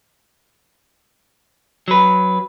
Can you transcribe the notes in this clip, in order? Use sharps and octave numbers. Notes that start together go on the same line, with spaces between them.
F#3 B4